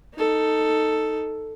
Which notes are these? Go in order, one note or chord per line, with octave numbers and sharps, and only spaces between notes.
D#4 A4